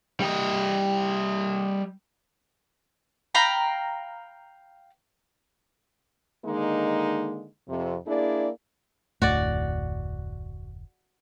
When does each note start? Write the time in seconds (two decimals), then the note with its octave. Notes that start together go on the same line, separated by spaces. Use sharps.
0.20 G3 D#5
3.35 F5 G5 A#5 B5
6.45 D3 D#3 G#3 A#3 D#4
7.69 F2 C3
8.07 A#3 D4 E4 G#4 D5
9.22 F1 D2 A2 F#4 D5